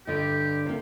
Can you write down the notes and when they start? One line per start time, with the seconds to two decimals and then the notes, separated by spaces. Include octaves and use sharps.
0.07 G2 D3 G4 D#5
0.66 C3 A#3